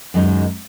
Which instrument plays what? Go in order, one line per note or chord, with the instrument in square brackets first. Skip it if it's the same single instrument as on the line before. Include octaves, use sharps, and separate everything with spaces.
[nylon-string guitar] F#2 D#3 G#3 D#4